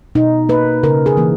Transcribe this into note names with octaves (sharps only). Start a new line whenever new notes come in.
B2 D#4
A#3 B4
C#3 A#4
G#4
E3 A#3